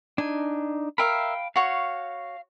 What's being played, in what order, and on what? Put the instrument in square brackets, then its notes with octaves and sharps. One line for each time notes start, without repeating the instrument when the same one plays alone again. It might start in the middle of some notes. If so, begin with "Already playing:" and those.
[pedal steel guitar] D4 D#4 [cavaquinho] G#5
[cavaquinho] A#4 E5 [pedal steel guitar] F5 G5 B5
[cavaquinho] F#4 C#5 [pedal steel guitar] F5